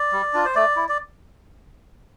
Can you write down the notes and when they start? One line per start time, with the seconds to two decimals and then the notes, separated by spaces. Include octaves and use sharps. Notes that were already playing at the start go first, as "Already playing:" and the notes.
Already playing: D5
0.12 G3
0.34 D4 F4
0.45 C5
0.55 A3 D5
0.76 E4
0.89 D5